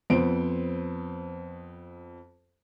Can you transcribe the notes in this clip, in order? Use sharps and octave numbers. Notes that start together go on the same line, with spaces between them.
F2 B3 C5 D7